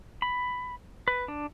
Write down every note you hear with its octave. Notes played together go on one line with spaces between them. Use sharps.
B5
B4
D4